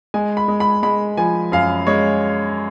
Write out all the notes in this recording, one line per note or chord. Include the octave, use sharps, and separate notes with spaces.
G#3 G#5
B5
G#3
B5
G#3 B5
F3 G#5
F#2 F5
G#3 C#5